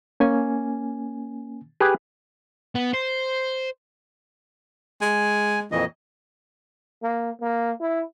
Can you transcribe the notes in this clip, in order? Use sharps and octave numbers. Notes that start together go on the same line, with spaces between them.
A#3 C#4 G#5
G4 G#4 B4
B3
C5
G#3 G#5
F2 A#2 E3 D#5
A#3
A#3
E4